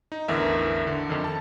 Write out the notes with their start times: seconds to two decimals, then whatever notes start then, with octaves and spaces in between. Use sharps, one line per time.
0.12 D#4
0.28 A1 E2 D3 E3 A#4 E5
0.87 D3
1.09 F2 D3 D#3
1.24 A5